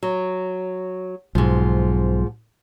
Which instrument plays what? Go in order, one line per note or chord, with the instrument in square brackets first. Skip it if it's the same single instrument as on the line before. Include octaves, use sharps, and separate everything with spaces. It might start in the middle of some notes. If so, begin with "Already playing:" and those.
[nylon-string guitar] F#3
[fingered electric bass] B1 [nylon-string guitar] G#2 F3